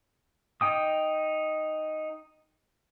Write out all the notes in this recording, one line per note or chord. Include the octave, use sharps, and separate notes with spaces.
D#4 G5 D#6